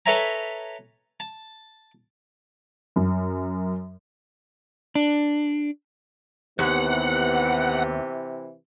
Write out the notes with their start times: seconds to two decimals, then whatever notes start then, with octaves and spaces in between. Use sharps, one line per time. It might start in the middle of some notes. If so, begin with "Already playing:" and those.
0.06 A4 B4 C#5 E5 G#5 A#5
1.20 A5
2.96 F#2
4.95 D4
6.59 D#2 C3 E3 B3 F#5